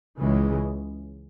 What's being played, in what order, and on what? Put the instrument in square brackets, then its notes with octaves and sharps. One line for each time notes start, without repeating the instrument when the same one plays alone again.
[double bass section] C#2 C#3 E3 G#3